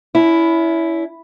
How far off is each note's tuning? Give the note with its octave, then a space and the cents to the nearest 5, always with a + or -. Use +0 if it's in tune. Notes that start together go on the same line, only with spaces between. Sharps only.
C#4 +40 E4 +0